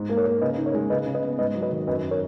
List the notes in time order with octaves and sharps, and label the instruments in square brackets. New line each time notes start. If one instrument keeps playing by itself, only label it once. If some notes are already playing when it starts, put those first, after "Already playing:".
Already playing: [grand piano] G#2
A#3
[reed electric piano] A#4 C#5
[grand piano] A#3
[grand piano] C#3 [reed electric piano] B4 D#5
[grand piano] D#4
[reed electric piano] A#4 C#5
[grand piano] G#3
[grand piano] C#3 [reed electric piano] B4 D#5
[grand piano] C#3
[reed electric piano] B4 D#5
[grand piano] B3
[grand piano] G#2 [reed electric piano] B4 D#5
[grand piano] F#3
[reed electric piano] B4 D#5
[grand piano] D#3
[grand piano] F#2 [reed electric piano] B4 D#5
[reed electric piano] A#4 C#5